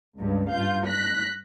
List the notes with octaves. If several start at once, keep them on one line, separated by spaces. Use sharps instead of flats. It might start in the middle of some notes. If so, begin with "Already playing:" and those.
C#2 G2
G2 F4 F5 G6
F#6 A#6 B6